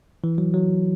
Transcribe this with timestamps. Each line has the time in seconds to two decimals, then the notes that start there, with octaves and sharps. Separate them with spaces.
0.24 E3
0.38 F#3
0.54 F#3